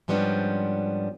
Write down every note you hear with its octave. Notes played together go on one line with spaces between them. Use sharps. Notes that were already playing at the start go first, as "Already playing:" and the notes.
G#2 F3 G3 B3 C#4 D4